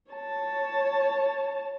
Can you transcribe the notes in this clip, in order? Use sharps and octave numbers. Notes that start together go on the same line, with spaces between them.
C#5 A5